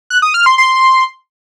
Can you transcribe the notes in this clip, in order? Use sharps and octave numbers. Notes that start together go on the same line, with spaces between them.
F#6
D#6
F6
C6
C6